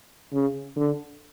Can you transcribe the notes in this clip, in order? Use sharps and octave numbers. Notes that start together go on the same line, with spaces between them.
C#3
D3